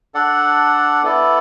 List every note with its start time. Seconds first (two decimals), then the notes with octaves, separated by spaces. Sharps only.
0.14 D4 A4 D5 F#5
1.03 B3 E4 A4 D5